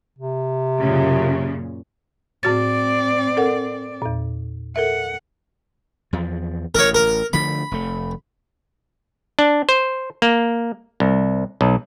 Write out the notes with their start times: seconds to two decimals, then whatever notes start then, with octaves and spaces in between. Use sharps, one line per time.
0.19 C3
0.80 F#2 A#2 C#3
2.43 A2 C4 F#4 D5 A6
3.37 A4 A#4 F#5
4.02 E2 A#2
4.76 A4 A#4 E5 F#5
6.13 E2 F3
6.75 A1 A#4 C#5
6.95 A#4
7.33 D3 F3 A3 B5
7.72 F1 A3
9.39 D4
9.69 C5
10.22 A#3
11.00 C2
11.61 B1